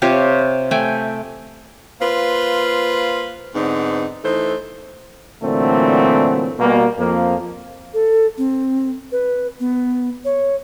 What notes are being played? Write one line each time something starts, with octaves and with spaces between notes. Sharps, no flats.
C3 F4 G4 C#5
A3 G5 G#5
A#3 F4 B4 C5 F5
G#2 D3 B3 C4 D#4
E3 A3 D#4 A4 C5
A#2 D3 E3 F#3 A3 C4
B2 G3 A#3
F2 F3 A#3
A4
C4
B4
B3
C#5